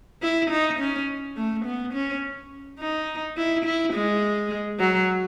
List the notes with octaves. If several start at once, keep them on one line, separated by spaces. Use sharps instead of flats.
E4
D#4
C#4
A3
B3
C#4
D#4
E4
E4
G#3
F#3